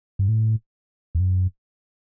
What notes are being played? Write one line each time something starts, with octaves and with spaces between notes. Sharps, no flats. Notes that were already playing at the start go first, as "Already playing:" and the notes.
G2
A2
E2
F#2